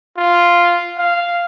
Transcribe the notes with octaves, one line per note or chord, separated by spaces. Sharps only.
F4
F5